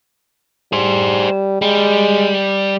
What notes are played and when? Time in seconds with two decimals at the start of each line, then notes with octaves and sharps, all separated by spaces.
0.73 G3 G#4 C5
1.62 G3 G#3